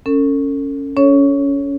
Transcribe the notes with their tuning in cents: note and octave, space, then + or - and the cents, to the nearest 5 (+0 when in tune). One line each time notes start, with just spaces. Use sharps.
C#4 +0 A4 +40
C#4 +20 A4 +0 C#5 +0